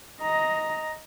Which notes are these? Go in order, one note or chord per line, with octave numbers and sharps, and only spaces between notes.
D#5 A#5